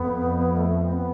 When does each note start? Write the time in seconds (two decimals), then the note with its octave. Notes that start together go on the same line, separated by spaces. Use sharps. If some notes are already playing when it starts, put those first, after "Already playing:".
Already playing: F2 B3
0.57 A3
0.83 C4
0.92 B3